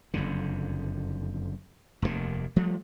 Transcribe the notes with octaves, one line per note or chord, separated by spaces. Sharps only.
F#1 F2 D3
F1 D#2 G#2 D#3
F3 G3 A3